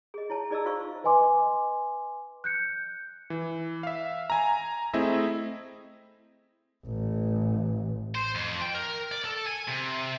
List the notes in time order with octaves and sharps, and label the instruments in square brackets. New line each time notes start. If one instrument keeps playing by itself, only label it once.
[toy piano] G#4 D#5
E4 C#5 A5
D#4 G#4 D5 D#5 A#5 E6
F4 F#4 C5 F5 C6 C#6
[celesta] B4 D#5 G#5 C6 D6
F#6 G6 C#7
[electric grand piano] E3
E5 F5
G#5 A#5
A3 C4 E4 G#4 D#5 E5
[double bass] A1
[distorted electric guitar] C5
F2
G5
A#4
D5
A4
G#5
C3